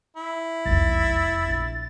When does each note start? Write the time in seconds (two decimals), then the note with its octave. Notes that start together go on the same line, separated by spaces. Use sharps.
0.17 E4
0.66 F1 B1 E2 A6
1.45 A#1